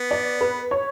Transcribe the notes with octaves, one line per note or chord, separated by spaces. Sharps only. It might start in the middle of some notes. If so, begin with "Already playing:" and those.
Already playing: B3
D5
B4
C#5